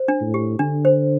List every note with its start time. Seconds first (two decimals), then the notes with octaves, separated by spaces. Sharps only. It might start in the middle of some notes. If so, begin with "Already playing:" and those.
Already playing: C5
0.08 D4
0.21 A2
0.34 G4
0.59 D3 D4
0.85 C5